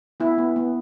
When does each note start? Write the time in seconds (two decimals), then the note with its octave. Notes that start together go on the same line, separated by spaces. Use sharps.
0.20 B3 E4
0.38 B3
0.56 B3